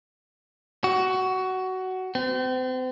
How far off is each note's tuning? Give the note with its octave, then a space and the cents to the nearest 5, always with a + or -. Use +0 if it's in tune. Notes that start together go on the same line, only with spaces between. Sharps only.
F#4 +15
C4 -35